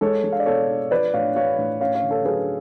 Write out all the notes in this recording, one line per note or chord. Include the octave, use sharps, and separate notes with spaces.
G#3 A4 C#5
G#3
F5
D5
B2 A4 C#5
D4
F3 B4 D5
A2 C#5 F5
A3 C#5 F5
A2
C#4 C#5 F5
C#5 F5
D3
A4 C#5
F#3 G#4 B4